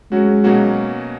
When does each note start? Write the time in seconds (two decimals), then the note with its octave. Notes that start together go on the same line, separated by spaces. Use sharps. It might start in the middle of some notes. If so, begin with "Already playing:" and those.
0.11 F#3 G#3 C#4 F#4
0.44 B2 F#3 A#3 C#4 F#4